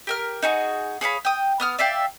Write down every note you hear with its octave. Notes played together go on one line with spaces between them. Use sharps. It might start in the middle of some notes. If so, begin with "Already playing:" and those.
G4 A#4 F6
D#4 F#4 G#4
G#4 C#5 F5 B5
G5 D#6
B3 D#6 F6
D5 E5 F5 G5